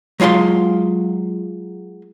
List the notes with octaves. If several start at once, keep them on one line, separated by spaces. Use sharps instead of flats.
F#3 G#3 F4 F5 C6